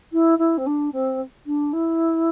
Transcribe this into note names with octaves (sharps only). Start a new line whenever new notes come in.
E4
E4
C4
D4
C4
D4
E4